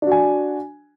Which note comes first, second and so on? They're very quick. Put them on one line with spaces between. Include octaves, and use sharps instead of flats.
D4 F#4 G#5